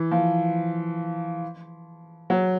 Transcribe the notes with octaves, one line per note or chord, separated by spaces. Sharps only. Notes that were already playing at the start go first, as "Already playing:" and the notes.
Already playing: E3
F3
F#3